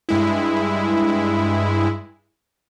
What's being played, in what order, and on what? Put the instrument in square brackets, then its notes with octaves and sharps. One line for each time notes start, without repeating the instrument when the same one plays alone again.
[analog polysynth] G2 G#3 E4